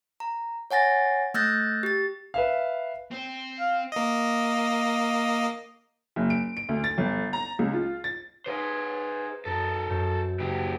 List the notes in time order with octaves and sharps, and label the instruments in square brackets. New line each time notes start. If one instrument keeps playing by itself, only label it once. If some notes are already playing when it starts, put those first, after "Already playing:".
[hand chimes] A#5
C#5 F#5 G#5 A6 A#6
A3 E6 F#6 G6 A6 A#6
G4 A6
[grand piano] B4 E5 F5
[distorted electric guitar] C4
[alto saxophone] F5
[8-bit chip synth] A#3 D#5
[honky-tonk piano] F#1
D7
D7
D2
A6
G1
A#5
C#2
F4
A6
[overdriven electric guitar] G#4 C5 [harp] B4 F5
[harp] F#2 [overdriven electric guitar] A4 A#4
[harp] D5
F#2 C#5 G6
[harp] F#1 [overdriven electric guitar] A#2 G4